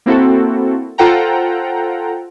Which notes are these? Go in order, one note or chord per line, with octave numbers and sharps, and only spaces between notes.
A#3 C4 E4 F#4 A4
F4 A4 C5 F#5 G5 A#5